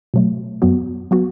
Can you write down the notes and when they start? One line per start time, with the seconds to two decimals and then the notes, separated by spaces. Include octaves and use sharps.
0.14 B2 F#3 A3
0.62 F#2 F#3 B3 F#4
1.11 F#3 B3 F#4